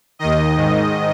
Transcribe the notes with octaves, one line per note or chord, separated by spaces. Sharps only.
D#2 D#3 D#5
G#2 D#3